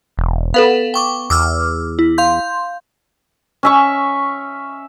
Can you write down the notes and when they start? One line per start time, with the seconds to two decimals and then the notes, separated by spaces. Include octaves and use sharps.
0.17 E1
0.54 B3 A4 B4 F5
0.94 G5 C#6 D6
1.30 E2 D6 E6 F6
1.99 E4
2.18 F5 C6 G6
3.63 C#4 E5 C#6